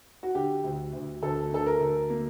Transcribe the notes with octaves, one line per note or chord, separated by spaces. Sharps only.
F#4
D3 G4
D2
D2
D2 A4
D3 A4
A#4
D2
A#3